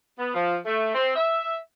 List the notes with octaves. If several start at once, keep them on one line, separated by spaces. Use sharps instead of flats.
B3
F3
A3
C4
E5